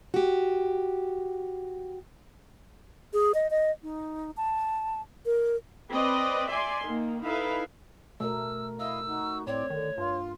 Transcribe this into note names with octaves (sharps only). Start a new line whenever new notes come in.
F#4 G4
G#4
D#5
D#5
D#4
A5
A#4
C4 B4 D5 D#5
D5 E5 G#5 C6
D#3 A#3
D#4 E4 A4 B4 E5 F5
B2 A3 A#4 E6
E4 D#5 F5 E6
D#4 F#4
A2 C4 C#5 D5
D3 D#3
G2 F4